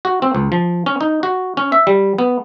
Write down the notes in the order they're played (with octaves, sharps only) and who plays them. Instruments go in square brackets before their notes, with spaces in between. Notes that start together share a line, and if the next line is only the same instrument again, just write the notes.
[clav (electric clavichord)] F#4
C4
C#2
F3
C#4
D#4
F#4
C#4
E5
G3
B3